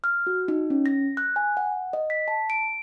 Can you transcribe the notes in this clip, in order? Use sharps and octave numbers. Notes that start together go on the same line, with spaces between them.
F6
F#4
D#4
C#4
A#6
F#6
G#5
F#5
D#5
B6
A5
D7